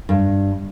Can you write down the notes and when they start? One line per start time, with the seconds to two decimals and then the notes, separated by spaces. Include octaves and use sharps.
0.09 G2